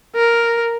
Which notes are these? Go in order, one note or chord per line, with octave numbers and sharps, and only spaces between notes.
A#4